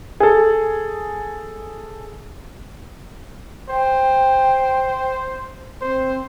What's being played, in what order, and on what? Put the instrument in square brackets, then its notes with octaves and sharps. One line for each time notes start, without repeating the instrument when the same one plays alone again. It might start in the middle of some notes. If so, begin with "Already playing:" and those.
[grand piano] G#4 A4
[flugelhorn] C5 [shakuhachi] G5
[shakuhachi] C4 [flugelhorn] C5